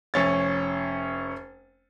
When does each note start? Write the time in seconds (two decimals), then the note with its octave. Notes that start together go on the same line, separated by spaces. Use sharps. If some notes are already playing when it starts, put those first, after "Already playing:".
0.14 F1 C#4 A6